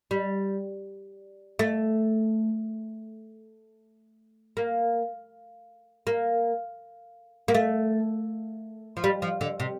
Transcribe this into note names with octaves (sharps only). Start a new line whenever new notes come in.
G3
A3
A#3
A#3
A#3
A3
F3
G3
F3
D3
C3